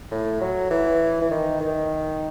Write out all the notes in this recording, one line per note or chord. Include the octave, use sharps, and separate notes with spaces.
A2
F#3
E3
E3
D#3
D#3